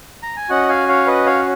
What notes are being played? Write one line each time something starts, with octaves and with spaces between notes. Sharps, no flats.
A#5
G#5
C#4 F#4 D#5 F#5
F5 G#5
C#5 F5
B4 D#5
C#5 F5